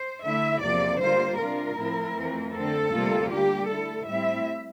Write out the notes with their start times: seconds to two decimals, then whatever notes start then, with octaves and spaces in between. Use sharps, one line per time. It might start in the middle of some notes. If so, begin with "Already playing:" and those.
Already playing: C5
0.24 D3 A3 E4 E5
0.61 E2 C3 F3 A#3 D5
1.00 D3 G3 A#3 F4 C5
1.39 C3 G3 D4 F4 A#4
1.77 A2 F3 A3 C4 E4
2.15 F2 E3 A3 C4
2.54 D3 A3 C4 A4
2.92 D2 C3 G3 A#3 F4
3.30 D3 G3 A#3 G4
3.68 D3 A3 E4 A4
4.07 A2 G3 C4 E4 E5